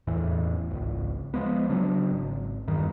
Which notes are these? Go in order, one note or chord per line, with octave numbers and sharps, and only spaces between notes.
E1 E2 A2 E3
G#1 C#2
F3 G#3 B3
C#3 F#3 D4
G#1
E2 G2 D#3